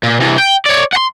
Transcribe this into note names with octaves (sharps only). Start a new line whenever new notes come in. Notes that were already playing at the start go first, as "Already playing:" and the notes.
A#2
C3 E3
G5
C#5 D5
F#5 C6